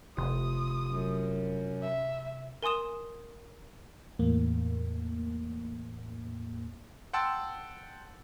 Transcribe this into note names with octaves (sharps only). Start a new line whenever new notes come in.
F1 C3 C6 D#6 E7
F#2
E5
A#4 G#5 C6 D#6 E7
E2 A2 A#3
F#5 G5 A5 C6 E6 A6